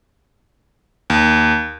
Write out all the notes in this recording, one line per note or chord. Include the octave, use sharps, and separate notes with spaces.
D#2